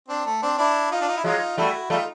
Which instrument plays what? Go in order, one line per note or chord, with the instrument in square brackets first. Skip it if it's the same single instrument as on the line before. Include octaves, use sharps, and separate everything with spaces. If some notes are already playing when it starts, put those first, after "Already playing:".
[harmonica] C4 D4
A3
C4 D4
D4 E4
D#4 F4
D4
D#4
E4
[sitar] F#3 G#3 [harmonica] D#4 F4
[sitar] G3 A3 [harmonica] E4 F#4
[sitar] G3 A3 [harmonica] D#4 F4